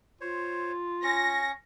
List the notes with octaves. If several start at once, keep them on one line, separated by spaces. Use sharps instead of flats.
F4 C5 C#5
C#4 C#6 A#6